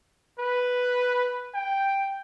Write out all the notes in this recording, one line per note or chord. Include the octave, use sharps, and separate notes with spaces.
B4
G5